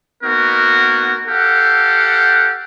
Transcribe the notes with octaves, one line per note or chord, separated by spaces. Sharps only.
A#3 B3 D#4 F#4 A#4
G4 A4 F5 F#5